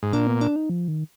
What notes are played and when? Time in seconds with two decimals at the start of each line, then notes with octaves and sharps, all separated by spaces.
0.03 G#2
0.13 A#2 D4
0.27 B3
0.41 D4
0.56 D#4
0.70 F3
0.88 D#3